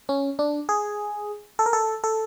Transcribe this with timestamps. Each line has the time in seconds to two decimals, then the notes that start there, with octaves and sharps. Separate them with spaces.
0.09 C#4
0.39 D4
0.69 G#4
1.59 A4
1.66 A#4
1.73 A4
2.04 A4